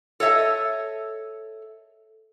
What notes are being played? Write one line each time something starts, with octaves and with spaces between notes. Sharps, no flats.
A4 C#5 D#5 E5 A5